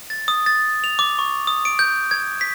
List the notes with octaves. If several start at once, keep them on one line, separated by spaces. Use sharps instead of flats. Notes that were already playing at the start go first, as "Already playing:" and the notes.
A6
D#6
A6
F7
D6
C#6
D#6
D7
G6
G#6
B6